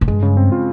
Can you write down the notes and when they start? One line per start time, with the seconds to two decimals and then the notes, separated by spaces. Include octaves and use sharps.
0.01 G#2
0.08 G2 G#3
0.23 C#3
0.37 C4
0.52 F4